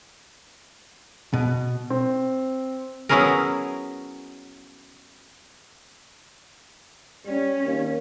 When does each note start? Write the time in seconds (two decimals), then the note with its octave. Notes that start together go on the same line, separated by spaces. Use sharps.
1.33 B2
1.90 C4
3.09 F#3 B3 C#4 E4 G#4 A#4
7.26 G3 C#4
7.67 D#2 A#3